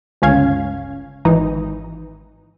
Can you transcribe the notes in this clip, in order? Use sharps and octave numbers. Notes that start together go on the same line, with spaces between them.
G1 C#2 C#4 F5 G#6
G#1 E3 D#4